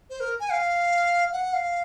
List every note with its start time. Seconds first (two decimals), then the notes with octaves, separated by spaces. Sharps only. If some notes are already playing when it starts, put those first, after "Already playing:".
0.10 C5
0.20 A#4
0.40 G#5
0.51 F5
1.33 F#5
1.53 F5